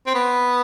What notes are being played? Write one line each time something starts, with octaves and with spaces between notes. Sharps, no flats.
C4
B3